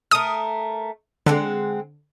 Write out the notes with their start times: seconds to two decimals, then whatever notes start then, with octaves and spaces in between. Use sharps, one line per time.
0.11 A3 A#4 D#6
1.26 D3 G#3 C4 F#5